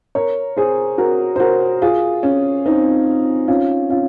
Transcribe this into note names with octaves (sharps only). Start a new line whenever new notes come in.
A#4 C#5
G#4 C5
F#4 A#4
C5
F#4 A#4
F4 G#4
C#4
C4 D#4
C#4 F4
C#4 F4